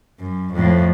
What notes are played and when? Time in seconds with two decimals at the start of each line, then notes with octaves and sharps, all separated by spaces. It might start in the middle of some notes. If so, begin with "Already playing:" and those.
0.20 F#2
0.54 F2 A2